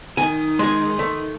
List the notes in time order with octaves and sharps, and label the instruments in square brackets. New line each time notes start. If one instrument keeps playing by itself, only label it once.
[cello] D#3 D#4 [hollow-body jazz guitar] G#5
[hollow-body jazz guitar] G#3 G#4 [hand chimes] C6
[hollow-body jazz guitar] A3